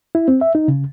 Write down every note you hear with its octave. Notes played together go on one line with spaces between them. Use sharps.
E4
C4
E5
D#4
C#3